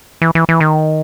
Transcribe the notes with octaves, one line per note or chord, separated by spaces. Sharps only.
E3
E3
E3
D#3